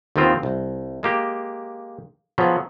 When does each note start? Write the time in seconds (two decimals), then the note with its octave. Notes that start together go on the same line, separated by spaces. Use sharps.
0.16 D#2 D#3 B3 C4 F4
0.43 C2
1.03 G#3 A#3 G4
2.38 C#3 F3 F#3 B3